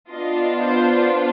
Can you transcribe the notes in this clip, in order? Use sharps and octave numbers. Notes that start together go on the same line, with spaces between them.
B3 D4 F4 D#5
C5